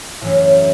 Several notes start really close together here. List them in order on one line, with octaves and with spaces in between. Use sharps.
A2 E3 F#2